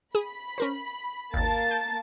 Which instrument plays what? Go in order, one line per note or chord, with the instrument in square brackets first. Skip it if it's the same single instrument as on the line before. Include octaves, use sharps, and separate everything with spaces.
[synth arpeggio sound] G#4 D#6 [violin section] B5
[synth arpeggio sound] C#4 A#4 C5
[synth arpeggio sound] G#1 D#2 [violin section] A#3 A5 A6
[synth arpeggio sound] G6 D7